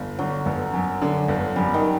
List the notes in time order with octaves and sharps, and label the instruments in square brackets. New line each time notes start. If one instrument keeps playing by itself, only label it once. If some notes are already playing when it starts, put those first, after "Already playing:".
Already playing: [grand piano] G1
[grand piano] D3 [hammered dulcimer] F#3
[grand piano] G1
F#2
D3
G1
[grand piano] F#2 [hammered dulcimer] G3
[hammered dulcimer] D#3